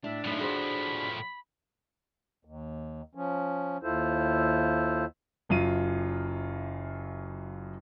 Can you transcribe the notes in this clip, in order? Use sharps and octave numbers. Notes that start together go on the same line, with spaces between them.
A2 D4 E5
F#2 A2 F3 A3 D#4 B5
F#4 G#4 C5 B5
D#2
F3 C#4
D#2 E4 F4 A4 C5
F#1 F#2 F4 D#7